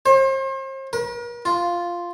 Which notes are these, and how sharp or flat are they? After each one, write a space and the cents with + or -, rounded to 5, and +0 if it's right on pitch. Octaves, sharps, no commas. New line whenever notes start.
C5 +40
A#4 +45
F4 -5